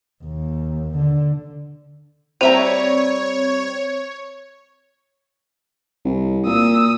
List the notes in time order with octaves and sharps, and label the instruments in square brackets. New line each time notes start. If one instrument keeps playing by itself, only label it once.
[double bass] D#2
D3
[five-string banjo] G3 E5 A#5 [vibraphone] C4 [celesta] C5 F7 [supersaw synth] C#5
[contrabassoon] C2
[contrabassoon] A#2 [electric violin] D#6 E6